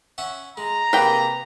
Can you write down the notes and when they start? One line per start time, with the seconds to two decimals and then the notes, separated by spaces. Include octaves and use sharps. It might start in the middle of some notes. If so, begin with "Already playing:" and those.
0.18 C#4 E5 F#5
0.57 G#3 A#5
0.93 C3 A#3 G#4 B4 G5 B5